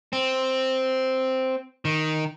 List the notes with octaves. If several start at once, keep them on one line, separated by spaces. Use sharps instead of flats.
C4
D#3